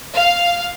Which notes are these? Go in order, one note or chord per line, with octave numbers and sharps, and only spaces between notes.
F5